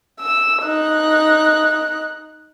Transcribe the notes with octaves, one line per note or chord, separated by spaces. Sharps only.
E6
D#4 F#6